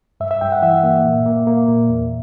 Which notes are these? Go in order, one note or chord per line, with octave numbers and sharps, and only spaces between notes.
G2 E5
E5
G2 G5
F#5
E3 E5
A#3
A#2
A#3
A#3
A#2
E2